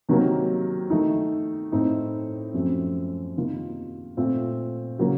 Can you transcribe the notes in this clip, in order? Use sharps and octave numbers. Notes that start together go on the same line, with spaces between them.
C3 D#3 F#3 A#3
D#3 A3 D#4
A2 A3 C4 D#4
F#2 F3 A3 C4
C3 D#3 A#3 F4
A#2 A3 C4 F4
C#3 F#3 A#3 F4